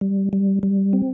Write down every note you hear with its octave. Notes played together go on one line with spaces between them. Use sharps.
G3
G3
G3
C4